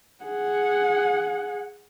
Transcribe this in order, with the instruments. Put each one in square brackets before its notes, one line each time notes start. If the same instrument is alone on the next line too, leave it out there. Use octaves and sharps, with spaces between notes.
[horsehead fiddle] G#4 F#5